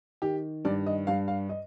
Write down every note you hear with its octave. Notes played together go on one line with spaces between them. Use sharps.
D#3 G4
G2 D5
D#5
G2 F5
F5
D#5